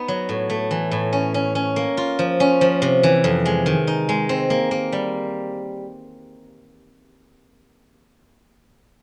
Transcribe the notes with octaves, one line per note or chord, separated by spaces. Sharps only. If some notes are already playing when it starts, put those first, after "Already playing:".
Already playing: B3 D#4
F#3
A2
A3
E3
A2
C#4
C#4
C#4
A#3
F4
F3
C#4
F3
C3
E3
F2
G#3
D#3
D#4
G#3
C4
A#3
A#3
G3